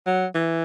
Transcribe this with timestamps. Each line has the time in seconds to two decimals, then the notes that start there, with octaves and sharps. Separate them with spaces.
0.07 F#3
0.35 E3